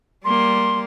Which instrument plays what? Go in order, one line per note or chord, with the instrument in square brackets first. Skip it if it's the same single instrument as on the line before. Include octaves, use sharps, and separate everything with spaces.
[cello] G3 A#3 [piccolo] C6